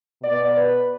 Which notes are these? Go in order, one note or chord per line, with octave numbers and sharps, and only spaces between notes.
B2 B3 D5
B4